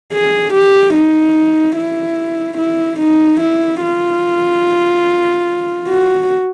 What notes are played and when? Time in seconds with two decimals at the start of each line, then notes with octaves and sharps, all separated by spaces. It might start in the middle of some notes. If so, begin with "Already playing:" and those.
0.12 G#4
0.54 G4
0.94 D#4
1.76 E4
2.58 E4
3.00 D#4
3.41 E4
3.82 F4
5.88 F#4